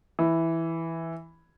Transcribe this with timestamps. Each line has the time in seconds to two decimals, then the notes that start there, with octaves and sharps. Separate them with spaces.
0.19 E3